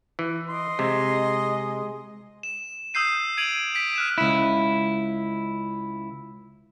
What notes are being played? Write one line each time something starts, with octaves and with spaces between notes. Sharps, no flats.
E3
D#5 C6
C3 G#3
E7
D#6 E6 G6 C7 D#7
G#6 D7 D#7 F7 F#7
B6 D7
F6 F#6 E7
C#2 E4